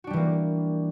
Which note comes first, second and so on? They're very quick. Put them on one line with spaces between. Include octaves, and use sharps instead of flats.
F#4 D4 G3 E3 A#3